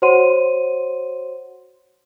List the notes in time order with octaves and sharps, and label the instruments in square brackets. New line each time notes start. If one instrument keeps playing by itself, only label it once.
[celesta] F#4 C5 C#5 F#5 C6 D#7